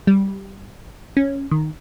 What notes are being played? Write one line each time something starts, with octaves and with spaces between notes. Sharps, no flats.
G3
C#4
D#3